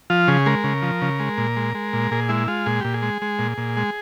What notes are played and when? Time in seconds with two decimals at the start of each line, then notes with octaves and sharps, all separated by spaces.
0.10 F3 F4
0.28 C#3 G#4
0.46 G#3 A#4
0.64 C#3
0.82 F3
1.02 C#3
1.20 G#3
1.38 A#2
1.57 G#3
1.75 G#3
1.93 A#2
2.11 A#2 G#4
2.29 G#3 E4
2.48 G#3 F4
2.66 A#2 G#4
2.81 A#2 G4
2.94 G#4
3.02 G#3
3.22 G#3
3.39 A#2
3.58 A#2
3.77 G#3